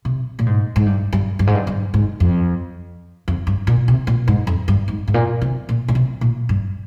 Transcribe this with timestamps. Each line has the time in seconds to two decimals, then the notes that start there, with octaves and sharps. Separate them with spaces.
0.05 C3
0.39 A#2
0.46 G#2
0.76 G#2
0.86 G2
1.13 G2
1.39 G2
1.47 G#2
1.55 G2
1.67 G2
1.94 G#2
2.20 F2
3.28 F2
3.47 G2
3.67 A#2
3.88 C3
4.07 A#2
4.28 G#2
4.47 F2
4.68 G2
4.88 G#2
5.08 G#2
5.14 A#2
5.42 C3
5.69 A#2
5.88 A#2
5.95 C3
6.21 A#2
6.49 G2